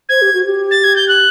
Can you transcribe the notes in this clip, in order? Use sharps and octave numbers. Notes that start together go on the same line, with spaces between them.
C5 G#6
G4
F#4
G4
A6
G#6
G6
F#6